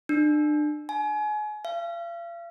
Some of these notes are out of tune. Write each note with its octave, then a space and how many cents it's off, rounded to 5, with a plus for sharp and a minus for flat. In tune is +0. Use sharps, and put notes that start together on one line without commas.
D4 +35
G#5 +30
F5 -40